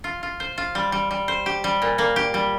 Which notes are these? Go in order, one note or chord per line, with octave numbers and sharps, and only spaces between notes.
F4
F4
C5
F4
G3
G3
G3
C5
G4
G3
A#2
A#3
G4
G3